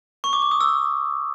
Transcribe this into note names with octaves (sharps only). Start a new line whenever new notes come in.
C#6
D6
C#6
D#6
E6